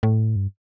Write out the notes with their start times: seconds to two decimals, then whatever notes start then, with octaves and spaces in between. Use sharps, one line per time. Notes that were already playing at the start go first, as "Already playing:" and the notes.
0.03 A2
0.36 G2